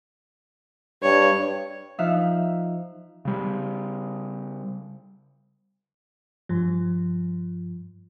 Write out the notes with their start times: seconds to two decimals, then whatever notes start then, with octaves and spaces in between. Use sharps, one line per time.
1.02 G2 C#5
1.98 F3 D#4 E5 F5 F#6
3.25 C#3 G3
6.49 G2 F3